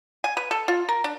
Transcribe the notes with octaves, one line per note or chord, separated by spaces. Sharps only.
G#5
B4
A4
F4
A#4
D4